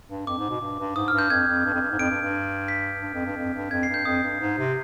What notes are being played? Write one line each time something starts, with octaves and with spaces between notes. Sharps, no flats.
G2
F2 D6
G#2
B2
G2
G2
G#2 D#6
F6
G2
G6
F2 G#6
F2
G2
F2
G2
G#2
F2 D7
G2
G2
B6
G2
F2
G2
F2
G2
F2 G#6
C7
G2
G6
F2 D#6
G2
G#2
C3